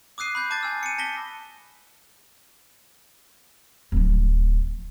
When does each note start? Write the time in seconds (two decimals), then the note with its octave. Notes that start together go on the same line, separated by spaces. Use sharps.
0.18 D6 D#6 F#6 C7 D#7
0.35 B5 F#6 G6
0.50 A5 D6 G6 A6
0.63 G#5 E6
0.83 C#7 D#7
0.98 A5 A#6 B6 G7
3.92 D1 F3